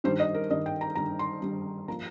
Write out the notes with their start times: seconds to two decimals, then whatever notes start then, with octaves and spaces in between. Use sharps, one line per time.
0.04 G2 D#3 G3 C5
0.20 D#5
0.34 A#4
0.50 G2 D#3 G3 D#5
0.66 G5
0.81 A#5
0.95 G2 D#3 G3 A#5
1.19 C6
1.42 G2 D#3 G3
1.88 F3 A#3 A#5